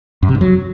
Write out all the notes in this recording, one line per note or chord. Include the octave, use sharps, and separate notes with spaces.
F#2
C3
G2
F#3